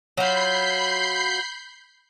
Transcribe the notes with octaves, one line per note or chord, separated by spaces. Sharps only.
F#3 F4 B5 G6 C7